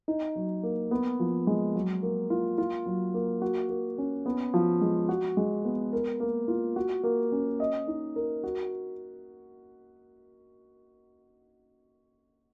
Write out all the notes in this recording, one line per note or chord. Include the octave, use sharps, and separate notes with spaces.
D#4
F#3
A#3
B3
F3
G#3
F#3
A#3
F4
F4
F#3
A#3
F#4
A#3
C#4
B3
F3
G#3
F#4
G#3
B3
A#4
A#3
F4
F#4
A#3
C#4
D#5
D#4
A#4
F#4